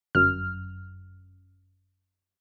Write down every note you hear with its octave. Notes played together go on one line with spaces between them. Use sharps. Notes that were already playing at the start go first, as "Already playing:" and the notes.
G1 F#2 F6